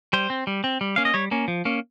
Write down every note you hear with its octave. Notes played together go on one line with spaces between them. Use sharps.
G3 C5
C4
G3
C4
G3
A#3 C#4 F5
D#5
G3 C#5
A#3 C#4
F3
A#3 C#4